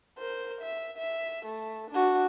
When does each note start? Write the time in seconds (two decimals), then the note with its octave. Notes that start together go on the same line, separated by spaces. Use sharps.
0.19 A#4 C5
0.61 E5
0.97 E5
1.45 A3
1.91 D4 F#4